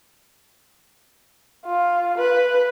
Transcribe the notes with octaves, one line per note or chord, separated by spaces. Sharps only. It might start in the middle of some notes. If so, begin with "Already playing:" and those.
F4
B4